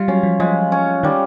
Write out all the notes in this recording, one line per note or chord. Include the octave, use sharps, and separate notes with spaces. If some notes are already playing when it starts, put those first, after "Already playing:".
Already playing: G3 F4
F#3 C#4
F3
F3 G#3
C#4
D#3 G3